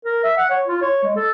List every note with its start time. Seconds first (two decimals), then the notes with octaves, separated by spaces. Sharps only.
0.05 A#4
0.24 E5
0.37 F#5
0.50 C#5
0.67 F4
0.81 C#5
1.03 G#3
1.16 A4